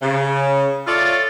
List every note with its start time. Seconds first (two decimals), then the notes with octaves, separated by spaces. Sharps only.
0.02 C#3
0.87 F4 A4 C#5 D5 E5 F5